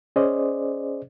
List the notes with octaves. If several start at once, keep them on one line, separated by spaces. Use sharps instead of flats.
C#4 G#4 C5 D5 D#5